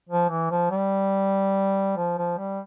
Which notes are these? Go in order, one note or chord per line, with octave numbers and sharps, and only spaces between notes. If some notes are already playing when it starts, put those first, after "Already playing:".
F3
E3
F3
G3
F3
F3
G3